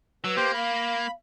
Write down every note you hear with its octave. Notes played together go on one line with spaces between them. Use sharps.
F#3 B4 E6
A#3 G4 C5
F5 B5